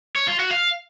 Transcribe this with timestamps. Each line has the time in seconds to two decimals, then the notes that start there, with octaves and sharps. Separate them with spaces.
0.16 C#5
0.27 F4
0.39 F#4
0.51 F5